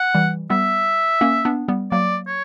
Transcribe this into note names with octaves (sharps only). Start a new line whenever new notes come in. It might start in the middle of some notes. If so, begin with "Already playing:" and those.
Already playing: F#5
E3 G3
G3 B3 E5
A#3 C#4
B3 D4
G3 B3
F#3 A#3 D5
C#5